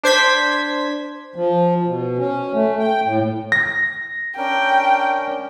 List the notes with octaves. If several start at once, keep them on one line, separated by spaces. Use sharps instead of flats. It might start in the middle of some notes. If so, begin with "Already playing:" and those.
D4 C5 G#6 B6
F3
B2
C#4
A3
G5
A2
A#6
C#4 D4 A#4 G5